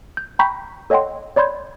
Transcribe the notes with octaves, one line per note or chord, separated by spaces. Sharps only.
G6
G5 A#5 B5 C#6 G6 B6
A4 C#5 D#5 F#5 G5 C6
C#5 D5 B5 C6 G6 G#6